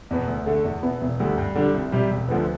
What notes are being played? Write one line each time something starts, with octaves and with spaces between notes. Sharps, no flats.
E2 B2 B3
D2
D3 A3
E2
B2 B3 E4
E1
D2 D3 G3
G2
D3 G3 D4
C2
C3 G3
E1
D2 D3 F3 B3